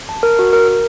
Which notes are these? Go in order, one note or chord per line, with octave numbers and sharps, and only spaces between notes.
A5
A#4
F#4
A#4
A#4